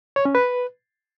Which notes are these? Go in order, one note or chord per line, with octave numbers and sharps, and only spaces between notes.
C#5
C#4
B4